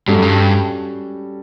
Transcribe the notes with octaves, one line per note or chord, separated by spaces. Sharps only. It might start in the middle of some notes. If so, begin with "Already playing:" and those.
G2 G3 C#4 F#4 A4
F#2
G2